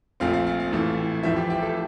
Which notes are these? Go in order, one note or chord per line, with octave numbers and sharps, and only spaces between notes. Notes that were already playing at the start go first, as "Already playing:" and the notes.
A#1 A#2 A3 C4 F5
F5
F5
F5
A1 A2 E3 A3
A1 A2 F3 E5
G4
G4
A4